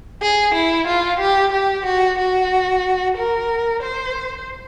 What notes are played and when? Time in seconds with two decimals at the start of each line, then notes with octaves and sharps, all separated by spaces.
0.22 G#4
0.55 E4
0.87 F4
1.20 G4
1.53 G4
1.86 F#4
2.19 F#4
3.17 A#4
3.83 C5